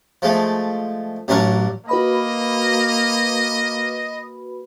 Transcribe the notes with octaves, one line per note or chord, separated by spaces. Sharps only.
F3 G#3 A3
A1 F#3 C#4 D4 A#4 C#6
A#3 F#4 B4 D#5 B5